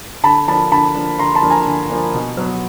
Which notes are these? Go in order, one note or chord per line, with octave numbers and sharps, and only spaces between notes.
D3 A5 B5
F3 A#3 D4 A5 B5
D3 A5 B5
F3 A#3 D4
D3 A#5 C6
A5 B5
F3 A#3 D4
G#5 A#5
D3
F3 A#3 D4
B2
F#3 B3